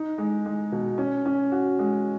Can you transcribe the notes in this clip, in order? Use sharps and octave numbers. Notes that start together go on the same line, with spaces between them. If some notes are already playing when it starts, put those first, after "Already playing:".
Already playing: D#4
G#3
G#3
B2
C#4
C#4
F#4
G#3